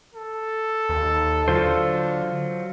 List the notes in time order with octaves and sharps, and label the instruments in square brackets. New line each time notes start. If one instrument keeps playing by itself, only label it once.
[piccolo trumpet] A4
[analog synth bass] D#2
[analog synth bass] D3 [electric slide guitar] F#3 F4 C5